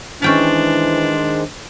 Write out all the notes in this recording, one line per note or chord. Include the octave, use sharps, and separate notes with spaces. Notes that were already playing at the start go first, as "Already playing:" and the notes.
D#3 E3 G#3 C#4 D4 C5 G5 A5